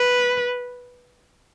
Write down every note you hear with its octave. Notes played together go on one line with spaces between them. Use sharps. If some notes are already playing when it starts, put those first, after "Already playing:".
Already playing: B4